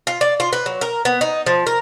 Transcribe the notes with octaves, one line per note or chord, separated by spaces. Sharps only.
F4
D5
F4
B4
F#3
A#4
B3
D#4
F3
A#4